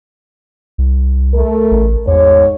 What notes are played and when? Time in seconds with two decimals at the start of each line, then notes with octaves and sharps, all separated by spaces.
0.78 C2
1.34 A3 A#4
1.71 A1
2.07 E2 G#2 C#5